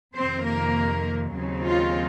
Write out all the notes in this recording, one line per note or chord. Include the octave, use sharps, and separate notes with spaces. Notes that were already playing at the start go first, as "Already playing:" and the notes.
F2 C3 D#3 C4 C5
A#3 A#4
D#2 C#3 F#3 C4 D#4
F4